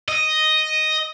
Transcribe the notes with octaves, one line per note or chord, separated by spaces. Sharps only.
D#5